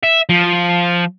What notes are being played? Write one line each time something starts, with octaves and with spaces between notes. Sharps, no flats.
E5
F3